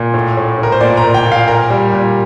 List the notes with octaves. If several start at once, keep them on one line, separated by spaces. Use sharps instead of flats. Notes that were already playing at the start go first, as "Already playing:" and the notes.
Already playing: A#2
A2
A2
A2
A#4
C5
A#2 D5
A#5
A#2
G5
A#2
F5
A#2 A#4
G3
A#2